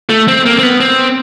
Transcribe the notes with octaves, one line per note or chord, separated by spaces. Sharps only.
A3
C4
A#3
C4
B3
C4